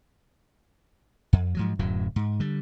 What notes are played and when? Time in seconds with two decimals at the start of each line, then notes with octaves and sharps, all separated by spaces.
1.33 F2
1.55 G#2 F3 F#3
1.79 D1 F#2 A2 F#3
2.16 G#2
2.40 D3 G3